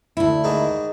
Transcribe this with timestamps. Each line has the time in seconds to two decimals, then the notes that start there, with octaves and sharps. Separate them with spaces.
0.17 D2 E4
0.44 G#2 D#3 D#4